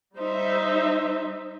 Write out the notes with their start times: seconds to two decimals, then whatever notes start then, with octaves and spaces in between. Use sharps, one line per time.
0.17 G3 D#4 C5 E5